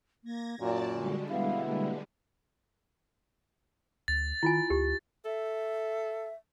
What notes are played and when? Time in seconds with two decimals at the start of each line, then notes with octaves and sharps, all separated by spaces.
0.24 A#3 G#6 A#6
0.60 F#2 A#2 F#4 D5 A5
0.92 D3 G3 G#3
1.29 B2 B3 E4 F5
1.67 A#3
4.08 D2 A6
4.43 D#3 E4 F4 G#5
4.70 D2 G4
5.25 A4 E5